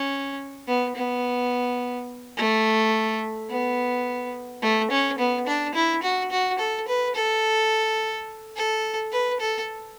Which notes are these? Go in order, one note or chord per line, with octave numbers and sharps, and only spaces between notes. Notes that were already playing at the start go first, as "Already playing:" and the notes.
Already playing: C#4
B3
B3
A3
B3
A3
C#4
B3
D4
E4
F#4
F#4
A4
B4
A4
A4
B4
A4